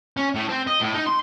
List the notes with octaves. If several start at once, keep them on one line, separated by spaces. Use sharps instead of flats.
C#4
A2
C4
D#5
A2
D#4
C6